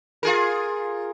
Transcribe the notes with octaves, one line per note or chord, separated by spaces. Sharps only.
F4 G#4 A#4